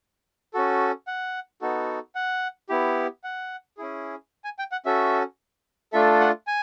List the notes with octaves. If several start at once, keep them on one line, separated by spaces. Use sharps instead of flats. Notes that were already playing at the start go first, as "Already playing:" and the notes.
C#4 F#4 A4
F#5
B3 D#4 F#4 A4
F#5
B3 E4 G4
F#5
C#4 E4 G#4
G#5
G5
F#5
C#4 F#4 A4 E5
A3 D4 F4 A4 E5
F#5
G#5